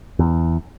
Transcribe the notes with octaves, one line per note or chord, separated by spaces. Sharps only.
E2